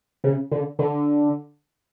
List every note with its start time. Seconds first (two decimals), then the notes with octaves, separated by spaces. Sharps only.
0.24 C#3
0.52 D3
0.79 D3